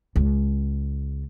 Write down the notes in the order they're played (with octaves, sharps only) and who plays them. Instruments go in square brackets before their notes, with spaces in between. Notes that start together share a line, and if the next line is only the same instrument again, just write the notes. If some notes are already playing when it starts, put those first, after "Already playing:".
[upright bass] C#2